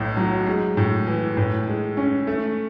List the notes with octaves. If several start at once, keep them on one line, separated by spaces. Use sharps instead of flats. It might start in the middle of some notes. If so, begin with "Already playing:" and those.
Already playing: B1 A2
F#3
G#3
A2
E3
A2
G#3
C#4
A3